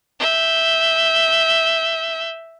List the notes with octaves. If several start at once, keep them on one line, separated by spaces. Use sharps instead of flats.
E5 G6